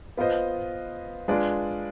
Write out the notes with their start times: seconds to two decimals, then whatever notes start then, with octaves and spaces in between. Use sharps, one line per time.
0.17 B3 F4 C5 D#5
1.28 G#3 D4 F4 B4 D5